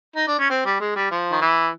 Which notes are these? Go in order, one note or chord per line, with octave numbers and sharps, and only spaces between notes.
D#4
D4
C#4
C4
G3
G#3
G3
F3
D#3
E3